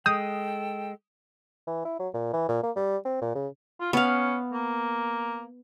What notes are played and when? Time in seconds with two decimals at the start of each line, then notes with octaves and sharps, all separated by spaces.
0.06 G#3 A4 G5 D#6 G6
1.67 E3
1.85 E4
1.99 F#3
2.14 A#2
2.33 E3
2.49 A#2
2.63 A#3
2.76 G3
3.05 C4
3.21 A#2
3.35 C#3
3.81 F4
3.93 B3 C#4 F5
4.53 A#3